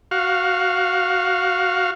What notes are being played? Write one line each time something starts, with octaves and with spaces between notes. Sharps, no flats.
F#4 F5